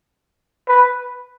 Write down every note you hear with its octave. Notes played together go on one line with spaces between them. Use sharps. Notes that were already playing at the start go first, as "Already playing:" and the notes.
B4